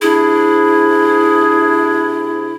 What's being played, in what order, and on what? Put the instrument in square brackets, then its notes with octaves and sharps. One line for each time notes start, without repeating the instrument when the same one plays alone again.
[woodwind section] C3 D4 G#4 [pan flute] E4